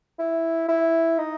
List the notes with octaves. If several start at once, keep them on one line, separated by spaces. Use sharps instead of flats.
E4
E4
D#4